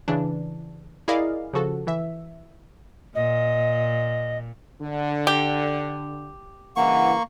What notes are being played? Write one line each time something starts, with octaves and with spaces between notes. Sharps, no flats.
C#3 E3 D4
E4 G#4 A#4 D5 D#5 F5
C#3 F3 F#4 A4
E3 E5
A#2 D#5
D3
G4
G2 C#3 E3 A#3 F#5 C#6